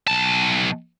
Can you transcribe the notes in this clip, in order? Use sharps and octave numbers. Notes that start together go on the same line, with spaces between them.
B1 A5